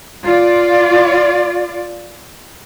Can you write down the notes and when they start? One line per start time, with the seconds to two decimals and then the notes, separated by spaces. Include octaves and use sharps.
0.24 F4 D5